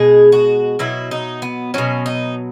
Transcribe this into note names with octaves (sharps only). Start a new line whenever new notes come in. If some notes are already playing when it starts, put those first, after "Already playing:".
Already playing: B2 G#3 G#4
F#4
B2 F#3 E4
D#4
B3
B2 F#3 C#4
D#4